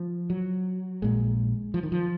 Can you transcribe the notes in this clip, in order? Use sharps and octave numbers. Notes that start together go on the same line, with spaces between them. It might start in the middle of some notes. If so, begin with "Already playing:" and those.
Already playing: F3
F#3
A#1 A#2 G#3
F3
D#3
F3